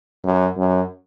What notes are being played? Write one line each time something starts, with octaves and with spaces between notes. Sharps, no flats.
F#2
F#2